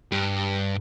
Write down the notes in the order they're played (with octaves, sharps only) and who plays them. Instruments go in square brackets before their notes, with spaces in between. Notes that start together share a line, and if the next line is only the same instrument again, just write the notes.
[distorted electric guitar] G2